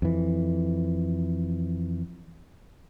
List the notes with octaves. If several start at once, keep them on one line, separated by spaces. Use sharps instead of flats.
F2 E3